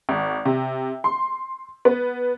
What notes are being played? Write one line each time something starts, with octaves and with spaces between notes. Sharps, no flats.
G#1
C3
C6
B3